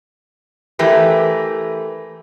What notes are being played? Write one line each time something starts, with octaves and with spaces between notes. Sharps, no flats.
E3 A3 G4 A#4 B4